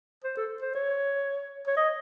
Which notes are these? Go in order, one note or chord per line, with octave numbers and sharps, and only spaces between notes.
C5
A4
C5
C#5
C#5
D#5